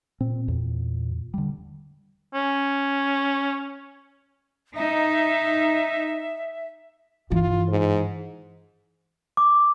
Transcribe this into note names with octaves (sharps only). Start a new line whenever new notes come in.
A#2 C4
E2
D3 G3
C#4
D#4 E5
G2 E3 F4
G#2
D6